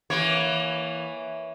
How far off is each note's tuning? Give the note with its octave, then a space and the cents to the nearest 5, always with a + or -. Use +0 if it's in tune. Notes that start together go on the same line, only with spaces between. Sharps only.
E3 +0 A#3 +20 C#5 +0